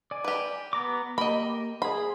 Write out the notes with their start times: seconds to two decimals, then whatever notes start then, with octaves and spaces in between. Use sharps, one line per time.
0.11 D5 G#5
0.24 G4 B4
0.73 B3 A#5 D6
1.18 A#3 G4 D#5 B5
1.82 G#4 C5 B5